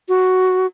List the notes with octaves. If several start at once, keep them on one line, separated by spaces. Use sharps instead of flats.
F#4